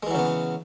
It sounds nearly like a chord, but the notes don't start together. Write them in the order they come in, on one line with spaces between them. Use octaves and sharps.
G#3 E3 F#3 C#3 B3